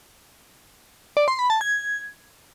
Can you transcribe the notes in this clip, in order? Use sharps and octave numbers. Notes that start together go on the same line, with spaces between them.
D5
C6
B5
A5
G#6